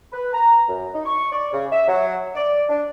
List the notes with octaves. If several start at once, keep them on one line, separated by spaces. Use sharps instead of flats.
B4
A#5
F#2
D#4
C#6
D5
C#3
E5
F#3
D5
D4